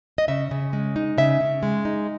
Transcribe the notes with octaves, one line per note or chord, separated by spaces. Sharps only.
D#5
C#3 E5
C#3
G#3
D#4
C#3 E5
C#3
G#3
D#4